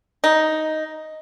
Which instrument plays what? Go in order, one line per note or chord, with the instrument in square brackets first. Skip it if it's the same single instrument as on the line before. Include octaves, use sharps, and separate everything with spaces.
[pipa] D#4